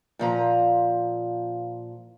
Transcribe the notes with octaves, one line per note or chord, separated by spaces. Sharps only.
A#2 F3 A#5